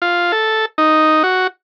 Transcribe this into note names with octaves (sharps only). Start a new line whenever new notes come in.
F4
A4
D#4
F#4